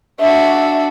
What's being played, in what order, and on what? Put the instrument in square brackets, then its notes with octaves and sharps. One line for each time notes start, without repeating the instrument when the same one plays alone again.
[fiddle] D4 F#4 [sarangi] E5